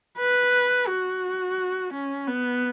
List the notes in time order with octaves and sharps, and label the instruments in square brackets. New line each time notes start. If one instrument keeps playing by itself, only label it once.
[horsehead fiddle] B4
F#4
C#4
B3